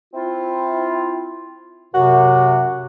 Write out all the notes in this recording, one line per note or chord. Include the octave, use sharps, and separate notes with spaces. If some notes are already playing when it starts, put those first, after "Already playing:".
C4 E4 F4
F#2 C3 F#4